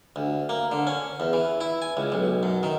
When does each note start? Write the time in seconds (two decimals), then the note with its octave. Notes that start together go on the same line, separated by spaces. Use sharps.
0.16 D2
0.49 A#3
0.72 D3
0.87 C#4
1.20 E2
1.33 E3
1.61 E4
1.82 G#5
1.97 C#2
2.12 B1
2.43 F#2
2.63 D#3